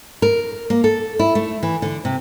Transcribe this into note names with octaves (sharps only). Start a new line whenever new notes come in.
A#4
A#3
A4
E4
A3
E3
D3
C3